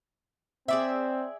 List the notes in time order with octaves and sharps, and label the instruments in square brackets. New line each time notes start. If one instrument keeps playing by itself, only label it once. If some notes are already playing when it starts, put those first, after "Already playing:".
[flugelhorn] C4 [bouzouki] G#4 D5 E5